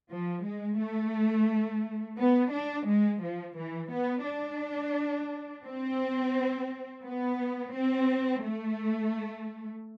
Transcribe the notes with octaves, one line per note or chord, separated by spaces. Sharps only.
F3
G#3
A3
B3
D4
G#3
F3
E3
B3
D4
C4
B3
C4
A3